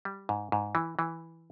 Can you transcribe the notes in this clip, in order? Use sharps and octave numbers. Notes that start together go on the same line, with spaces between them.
G3
G#2
G#2
E3
E3